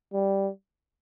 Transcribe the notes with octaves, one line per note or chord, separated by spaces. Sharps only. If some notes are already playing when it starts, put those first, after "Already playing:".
G3